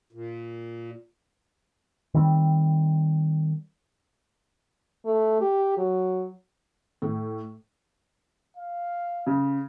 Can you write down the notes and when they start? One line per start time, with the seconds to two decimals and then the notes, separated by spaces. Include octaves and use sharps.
0.13 A#2
2.14 D#3 G3 C4
5.05 A3
5.41 G4
5.78 F#3
7.02 A2
8.57 F5
9.27 C#3